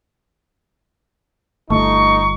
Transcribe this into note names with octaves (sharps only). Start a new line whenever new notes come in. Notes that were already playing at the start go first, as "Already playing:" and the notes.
G1 A3 D#4 C#6